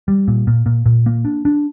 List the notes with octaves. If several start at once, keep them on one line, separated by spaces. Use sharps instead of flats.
G3
A#2
A#2
A#2
A#2
A#3
D4
D4